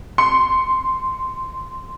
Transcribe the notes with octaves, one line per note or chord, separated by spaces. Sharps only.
C6 C#7